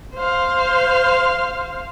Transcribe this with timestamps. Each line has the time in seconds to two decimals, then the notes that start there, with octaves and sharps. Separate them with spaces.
0.15 C5 F5